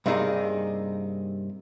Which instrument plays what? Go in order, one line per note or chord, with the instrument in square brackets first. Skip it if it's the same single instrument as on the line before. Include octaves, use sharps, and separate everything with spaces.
[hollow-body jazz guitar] G2 C3 A#3 D#4 G#4